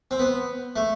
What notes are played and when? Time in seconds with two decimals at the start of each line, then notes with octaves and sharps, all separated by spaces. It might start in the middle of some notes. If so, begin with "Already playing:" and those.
0.11 C4
0.19 B3
0.76 A3